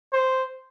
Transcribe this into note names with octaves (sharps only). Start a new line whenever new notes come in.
C5